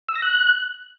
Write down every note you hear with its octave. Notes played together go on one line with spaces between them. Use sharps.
E6
A#6
F#6